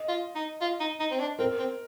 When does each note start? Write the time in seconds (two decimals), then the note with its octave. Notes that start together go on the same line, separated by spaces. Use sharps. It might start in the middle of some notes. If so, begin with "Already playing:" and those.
Already playing: D#5
0.09 F4
0.35 D#4
0.61 F4
0.80 D#4
1.00 D#4
1.11 C4
1.20 D4
1.39 C4 A#4
1.59 C4